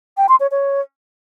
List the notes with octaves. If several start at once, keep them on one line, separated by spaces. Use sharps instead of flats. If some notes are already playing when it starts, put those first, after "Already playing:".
G5
C6
C#5
C#5